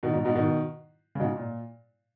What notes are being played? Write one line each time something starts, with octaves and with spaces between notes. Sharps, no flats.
B2 D#3
G#2 B2
G#2 B2
B2 D#3
C#3
G#2 B2
A#2